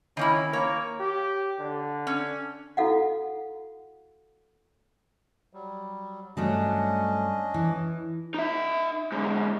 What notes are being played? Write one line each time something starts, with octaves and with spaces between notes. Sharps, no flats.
D#3 A#3 C#4 E4
A#3 C#5
G4
D3
C#4
E4 F#4 A4 F5 F#5
F#3 G3
G2 F#3 A3 C#4 D4 D#5
E3
D#4 E5
G#2 D3